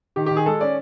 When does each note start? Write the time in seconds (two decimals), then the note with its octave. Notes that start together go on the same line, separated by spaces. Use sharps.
0.16 D#3 G4
0.26 G4
0.31 D#3
0.36 G#4
0.46 G#3 A4
0.61 C#4 D5